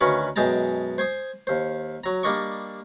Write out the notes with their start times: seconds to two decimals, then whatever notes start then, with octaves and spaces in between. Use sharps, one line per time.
0.01 D2 D#3 C#4 F#4 B4
0.36 F#2 B2 G#3 G5 A5 A#5
0.98 C5 G#5 C6 D#6
1.47 D#2 C5
2.04 F#3 A#5
2.23 G3 A#3 D4 D#5 C#6